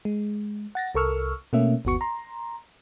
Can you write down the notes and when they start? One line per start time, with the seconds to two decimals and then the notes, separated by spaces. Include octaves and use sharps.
0.05 G#3
0.75 F#5 A6 A#6
0.95 C2 A4 A#4 C#6 E6 F6
1.53 B2 A3 A#3 C#4 E5
1.85 G1 D#2 B3 F#4 C#6 C#7
2.01 A#5 C6